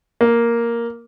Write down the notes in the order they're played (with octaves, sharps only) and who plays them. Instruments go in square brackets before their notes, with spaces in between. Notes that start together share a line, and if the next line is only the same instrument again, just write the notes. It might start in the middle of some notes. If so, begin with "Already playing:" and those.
[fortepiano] A#3